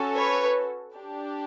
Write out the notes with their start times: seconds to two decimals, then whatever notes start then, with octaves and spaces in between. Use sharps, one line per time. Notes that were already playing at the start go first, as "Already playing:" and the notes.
Already playing: C#4 F#4 A4
0.16 B4 C#5
0.96 D4 G4